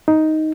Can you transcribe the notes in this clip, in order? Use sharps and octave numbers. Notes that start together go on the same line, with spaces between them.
D#4